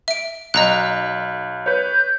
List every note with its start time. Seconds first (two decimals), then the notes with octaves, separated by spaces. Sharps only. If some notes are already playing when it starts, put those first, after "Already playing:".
0.08 E5 D7
0.54 B1 D#5 A#5 F#6
1.66 B4 C#5 G6